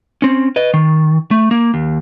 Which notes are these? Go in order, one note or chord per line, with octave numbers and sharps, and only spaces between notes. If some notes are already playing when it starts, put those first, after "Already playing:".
C4 C#4
B4 D#5
D#3
A3
A#3
D#2